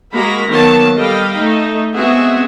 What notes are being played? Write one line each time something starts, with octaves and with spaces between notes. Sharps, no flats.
G#3 A#3 F#4 A#5 B5
D#3 F#3 A#3 B3 A5
G3 A4 D#5 F5 G5 B5
A3 D#4
G#3 B3 C4 F#4 G#4 E5